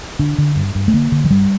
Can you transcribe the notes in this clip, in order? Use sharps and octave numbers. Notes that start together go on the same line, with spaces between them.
D3 D4
D3
G2
G2
A3
D3 A#3
D3
F3
G2 G3